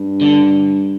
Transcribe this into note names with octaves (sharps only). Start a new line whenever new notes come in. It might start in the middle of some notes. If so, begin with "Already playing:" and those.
Already playing: G2
D3